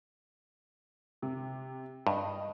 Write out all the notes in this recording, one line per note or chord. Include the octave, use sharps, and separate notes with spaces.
C3
G2 D#5